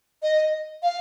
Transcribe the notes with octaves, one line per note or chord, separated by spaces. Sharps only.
D#5
F5